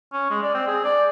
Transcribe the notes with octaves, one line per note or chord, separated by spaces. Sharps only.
C#4
G#3
D5
C4
G#4
D5